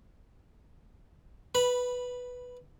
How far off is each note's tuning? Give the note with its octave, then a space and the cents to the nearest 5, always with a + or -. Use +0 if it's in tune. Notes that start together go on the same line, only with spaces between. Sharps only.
B4 +0 B5 -15